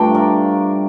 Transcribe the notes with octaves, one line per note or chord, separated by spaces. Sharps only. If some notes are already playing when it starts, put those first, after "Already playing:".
Already playing: G2 F3 A3 D4 G5 A#5
A#4 D5